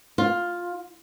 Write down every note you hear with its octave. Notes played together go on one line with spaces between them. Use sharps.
F4